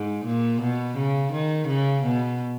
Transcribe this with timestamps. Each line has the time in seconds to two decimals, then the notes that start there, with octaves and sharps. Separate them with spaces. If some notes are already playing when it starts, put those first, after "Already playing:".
Already playing: G#2
0.25 A#2
0.61 B2
0.97 C#3
1.33 D#3
1.68 C#3
2.04 B2